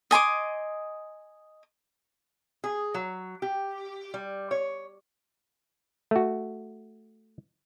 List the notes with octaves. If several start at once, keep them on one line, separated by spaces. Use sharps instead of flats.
D#5 G#5 C6 D6
G#4
F#3
G4
G3
C#5
A3 F#4